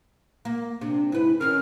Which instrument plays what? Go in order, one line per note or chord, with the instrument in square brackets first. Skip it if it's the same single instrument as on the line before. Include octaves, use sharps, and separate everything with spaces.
[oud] A#3
[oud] C3 [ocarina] D4
[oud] G#2 B4 [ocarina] E4
[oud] D#3 A#4 [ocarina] C#4 [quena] F6